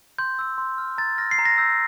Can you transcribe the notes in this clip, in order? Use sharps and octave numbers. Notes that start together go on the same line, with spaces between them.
C6 G6
E6 G6
C6
F6
A#5 A6
F6 A#6
C7
A#5
A#6
E6 G6